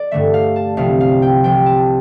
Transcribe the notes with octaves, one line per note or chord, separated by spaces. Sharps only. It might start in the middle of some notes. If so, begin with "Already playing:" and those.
Already playing: D5
G2 D3 A3 E5
F5
A5
C2 C3 F3 F5
F5
G5
C2 C3 F3 G5
A5